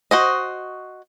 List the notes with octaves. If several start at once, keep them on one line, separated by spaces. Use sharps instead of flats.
F#4 C5 D#5